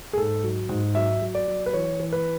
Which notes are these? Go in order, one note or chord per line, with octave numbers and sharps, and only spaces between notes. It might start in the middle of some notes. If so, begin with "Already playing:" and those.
G#4
G#2 A4
F#3
G#2
F#3 E5
F#3
D5
F#3
B4
E3 C#5
E3
B4